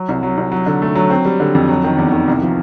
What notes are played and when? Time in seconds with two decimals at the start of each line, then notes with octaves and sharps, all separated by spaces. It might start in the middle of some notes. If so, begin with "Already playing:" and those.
Already playing: F#3
0.09 C2
0.23 F#3
0.37 C2
0.52 F#3
0.66 D3
0.82 A3
0.95 F#3
1.10 C4
1.25 G3
1.40 D3
1.55 F2
1.68 F#3
1.84 D#3
1.98 E2
2.12 D#3
2.28 C2
2.42 F3